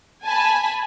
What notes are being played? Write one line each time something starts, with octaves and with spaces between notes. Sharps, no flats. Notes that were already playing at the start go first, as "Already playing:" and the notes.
G#5 A5 B5